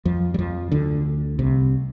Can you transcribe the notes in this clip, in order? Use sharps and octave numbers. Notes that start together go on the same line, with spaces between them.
F2 F3
G3
F2 F3
D2 D3
C2 C3